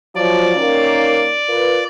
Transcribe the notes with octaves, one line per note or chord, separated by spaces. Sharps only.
F3 F#3 D5
D#3 A#3 C#4
F4 A#4 B4